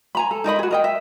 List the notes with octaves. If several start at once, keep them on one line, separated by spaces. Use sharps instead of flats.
G#5 A#5 B5
A4
D#4 A#4 D#5 B5
F#4 G#4
A#4 D#5 G5
E5